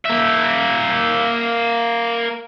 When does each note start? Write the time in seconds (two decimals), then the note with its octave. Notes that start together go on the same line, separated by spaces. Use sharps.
0.06 A#3 E5